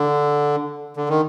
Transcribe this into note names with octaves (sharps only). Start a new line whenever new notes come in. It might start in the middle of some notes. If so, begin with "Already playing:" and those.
Already playing: D3
D3
D#3